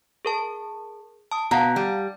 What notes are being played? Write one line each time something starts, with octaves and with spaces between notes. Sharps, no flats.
G#4 A#4 A5
A5 D#6
B2 F5 F#5 A5 A#5
G3